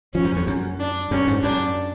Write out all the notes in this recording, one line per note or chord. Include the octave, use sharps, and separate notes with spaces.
F3 C#4
F#2
F2
F#2
D4
F#2 C#4
G#2
F#2 D4